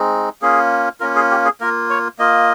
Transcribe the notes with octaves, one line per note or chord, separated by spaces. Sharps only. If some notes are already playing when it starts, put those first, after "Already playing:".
Already playing: G#3 C4 D#4
A#3 C#4 F4 G#4
A#3 C#4 F4 A#4
G#4
G4
G#4
A#3 F4 A#4
C#5
A#3 F4 D#5